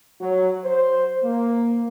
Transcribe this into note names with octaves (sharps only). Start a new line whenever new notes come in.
F#3
C5
A#3